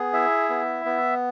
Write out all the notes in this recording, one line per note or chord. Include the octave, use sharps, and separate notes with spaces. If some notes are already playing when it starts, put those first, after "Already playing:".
Already playing: B3 G#4
E4 E5
B3
B3